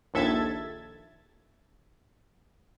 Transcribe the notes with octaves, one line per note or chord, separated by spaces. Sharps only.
A#1 D#2 A4 E5 G#6 A6